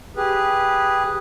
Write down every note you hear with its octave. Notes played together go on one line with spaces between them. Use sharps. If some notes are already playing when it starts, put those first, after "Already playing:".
G4 G#4 B4